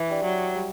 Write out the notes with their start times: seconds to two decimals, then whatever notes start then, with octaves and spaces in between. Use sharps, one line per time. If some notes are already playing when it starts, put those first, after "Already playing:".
Already playing: E3
0.09 D4 G4 D5
0.24 F#3
0.54 G3